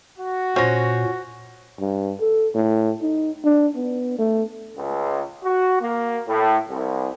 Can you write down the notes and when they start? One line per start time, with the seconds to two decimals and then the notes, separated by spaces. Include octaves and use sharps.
0.17 F#4
0.56 A#2 C#4 C5 A#6
1.80 G2
2.20 A4
2.55 A2
3.02 D#4
3.45 D4
3.76 B3
4.19 A3
4.77 C#2
5.44 F#4
5.81 A#3
6.28 A2
6.69 C2